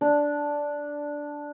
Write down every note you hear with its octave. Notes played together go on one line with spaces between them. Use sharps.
D4